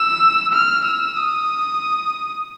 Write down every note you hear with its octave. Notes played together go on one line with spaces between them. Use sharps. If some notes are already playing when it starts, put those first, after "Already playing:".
Already playing: E6
F6
E6
D#6